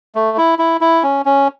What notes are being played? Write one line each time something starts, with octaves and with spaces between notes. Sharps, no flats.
A3
E4
E4
E4
C#4
C#4